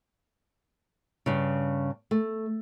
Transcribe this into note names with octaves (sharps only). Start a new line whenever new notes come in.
G2 C#3
A3